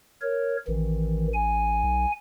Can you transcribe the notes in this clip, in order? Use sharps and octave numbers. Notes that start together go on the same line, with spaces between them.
A#4 C#5
A1 D#3 E3
G#5
B1